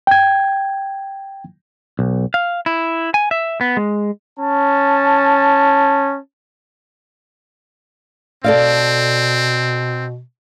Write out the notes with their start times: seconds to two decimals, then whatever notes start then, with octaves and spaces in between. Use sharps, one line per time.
0.07 G5 G#6
1.99 B1
2.34 F5
2.66 E4
3.14 G#5
3.31 E5
3.61 B3
3.77 G#3
4.40 C#4 A5
8.44 B2 C4 A4 D5 F5